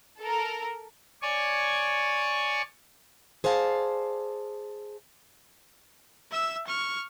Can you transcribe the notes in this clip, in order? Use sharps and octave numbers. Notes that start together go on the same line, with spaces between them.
A4 A#4
C#5 D5 G#5 C#6
G#4 C5 D5 F5 A5
E5 E6
C#6 F6